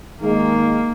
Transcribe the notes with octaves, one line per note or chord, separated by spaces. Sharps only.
D#3 G#3 A#3